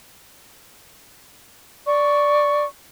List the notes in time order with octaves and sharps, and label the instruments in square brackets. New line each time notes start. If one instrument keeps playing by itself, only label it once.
[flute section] D5 C#6